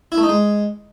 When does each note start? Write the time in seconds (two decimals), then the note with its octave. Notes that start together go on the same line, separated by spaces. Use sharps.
0.12 E4
0.18 A3
0.23 D#4
0.29 G#3